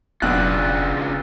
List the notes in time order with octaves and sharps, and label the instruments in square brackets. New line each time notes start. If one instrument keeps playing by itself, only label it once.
[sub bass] F1 [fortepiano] B1 F#6 [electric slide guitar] C#3 D4 F4